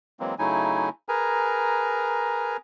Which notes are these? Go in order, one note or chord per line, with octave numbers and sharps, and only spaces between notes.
E3 F#3 G#3 A#3 C4
C#3 F#3 A3 D#4 E4 G#5
G#4 A#4 B4 G#5 A#5